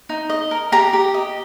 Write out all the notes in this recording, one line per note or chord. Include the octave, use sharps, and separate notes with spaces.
D#4
D#5
A#4
G4 A#5
G4
D#5